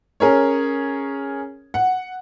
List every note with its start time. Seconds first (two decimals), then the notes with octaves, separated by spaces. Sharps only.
0.20 C#4 G#4 A#4 C#5
1.74 F#5